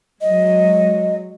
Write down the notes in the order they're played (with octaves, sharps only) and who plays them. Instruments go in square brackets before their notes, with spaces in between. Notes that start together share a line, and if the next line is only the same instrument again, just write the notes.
[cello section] F#3 G#3 [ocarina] D#5